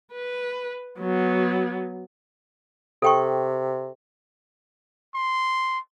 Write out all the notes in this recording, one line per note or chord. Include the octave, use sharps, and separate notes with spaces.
B4
F#3 B3
C3 A4 G5 C#6
C6